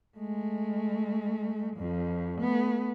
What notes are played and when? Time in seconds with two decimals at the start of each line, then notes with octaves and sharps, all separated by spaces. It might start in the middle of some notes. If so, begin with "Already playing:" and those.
0.17 G#3 A3
1.77 F2 F3
2.38 A3 B3